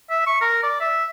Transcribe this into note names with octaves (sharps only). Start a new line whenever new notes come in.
E5
C#6
A#4
D5
E5